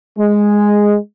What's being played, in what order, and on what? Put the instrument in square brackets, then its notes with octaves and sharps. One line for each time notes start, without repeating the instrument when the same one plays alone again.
[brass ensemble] G#3